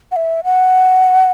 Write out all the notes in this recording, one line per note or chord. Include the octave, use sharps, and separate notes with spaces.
F#5
E5
F#5